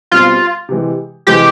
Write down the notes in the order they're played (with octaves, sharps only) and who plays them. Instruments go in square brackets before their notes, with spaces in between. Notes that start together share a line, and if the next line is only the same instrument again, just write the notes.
[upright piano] B2 G3 C4 [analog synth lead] F4
[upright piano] C3 E3 G#3
[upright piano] C3 E3 G#3 [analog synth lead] G4